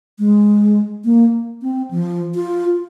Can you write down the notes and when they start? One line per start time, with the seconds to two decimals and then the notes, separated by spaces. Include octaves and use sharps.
0.19 G#3
1.05 A#3
1.62 C4
1.91 F3
2.35 F4